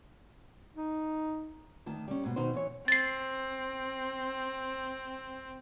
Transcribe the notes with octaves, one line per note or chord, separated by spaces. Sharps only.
D#4
D2 D#3 A5
G3 C#4
G#2 B2
B2 D#3 D#4 F#4 C5
E3 C#5
C4 A6 C7